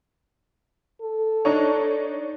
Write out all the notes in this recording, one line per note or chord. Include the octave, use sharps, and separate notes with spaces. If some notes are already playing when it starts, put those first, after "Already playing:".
A4
D4 D#4 C#5